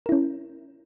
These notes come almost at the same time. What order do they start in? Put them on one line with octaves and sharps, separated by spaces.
A#4 E4 C#4